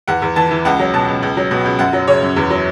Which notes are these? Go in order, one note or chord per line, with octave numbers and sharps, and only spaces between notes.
E2 F#5
E2
E3 A5
E3
C#2 F#5
F#3
B2 A5
C#2
C#2
F#3
B2
C#2
F#2 F#5
F#3
C#3 C#5
F#2
E2
F#3